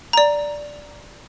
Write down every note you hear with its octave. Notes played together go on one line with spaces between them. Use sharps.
D5 A#5